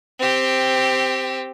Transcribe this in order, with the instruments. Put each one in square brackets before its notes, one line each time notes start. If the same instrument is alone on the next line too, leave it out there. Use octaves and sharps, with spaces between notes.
[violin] C4 G4